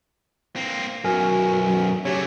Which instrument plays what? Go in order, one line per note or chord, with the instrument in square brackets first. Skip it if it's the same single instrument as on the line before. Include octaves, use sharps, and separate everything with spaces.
[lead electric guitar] A#3 C4
[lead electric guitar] B1 F#2 [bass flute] F#4 [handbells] A#4 G#5 F6
[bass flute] F#3
[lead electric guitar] C#3 A3 [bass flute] G4 [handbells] C#5